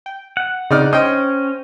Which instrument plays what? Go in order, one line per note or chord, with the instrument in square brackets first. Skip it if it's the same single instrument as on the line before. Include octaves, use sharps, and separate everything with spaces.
[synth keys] G5
[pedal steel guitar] F#5
[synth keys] C#3 C4 [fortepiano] D#4 D5 F6
[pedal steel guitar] C#4 [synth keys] C5 G5 [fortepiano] D#5